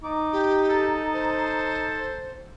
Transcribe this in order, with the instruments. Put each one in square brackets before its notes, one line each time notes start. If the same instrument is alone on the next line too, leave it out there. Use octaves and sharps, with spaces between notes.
[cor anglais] D#4 [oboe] D6
[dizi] G4
[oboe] A4
[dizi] C5